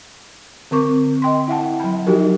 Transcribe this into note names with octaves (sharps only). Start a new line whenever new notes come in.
D3 C4 A#4 C#6 D6
D#5 G5 C6
E4 E5 F#5 A5
F#3 G5 B5
F3 F#3 D#4 F#4 G4 A#4